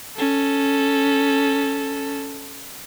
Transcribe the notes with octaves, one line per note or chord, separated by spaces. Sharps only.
C#4 A4